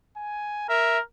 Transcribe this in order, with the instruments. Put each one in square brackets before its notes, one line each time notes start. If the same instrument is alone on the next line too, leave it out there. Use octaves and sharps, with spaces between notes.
[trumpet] G#5
[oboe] A#4 [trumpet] E5